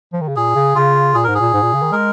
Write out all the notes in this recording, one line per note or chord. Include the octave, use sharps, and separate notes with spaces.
F3
D#3
C#3
A#2 G#4
C#3
C#3 F4
A#2 G#4
G#2 A#4
G#4
A#2
G#2
A#2
C#3
D#3
G#3 A#4